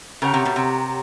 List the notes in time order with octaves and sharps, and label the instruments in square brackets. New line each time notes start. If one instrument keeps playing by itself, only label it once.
[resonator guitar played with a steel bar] C#3 [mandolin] G4 A#4 C#5 F#5
[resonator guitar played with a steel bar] C3
B2
C3